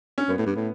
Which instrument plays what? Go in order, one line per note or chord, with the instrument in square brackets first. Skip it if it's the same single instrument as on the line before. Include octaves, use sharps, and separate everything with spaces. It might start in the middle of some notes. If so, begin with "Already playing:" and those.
[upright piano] C#4
[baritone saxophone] F#2 [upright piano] B3
[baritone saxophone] A2
G2
A2